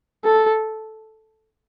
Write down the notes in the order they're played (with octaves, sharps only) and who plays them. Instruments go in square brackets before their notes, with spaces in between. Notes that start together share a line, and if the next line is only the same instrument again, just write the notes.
[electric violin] A4